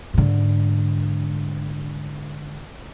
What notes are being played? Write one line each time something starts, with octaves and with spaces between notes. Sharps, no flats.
G#2 D3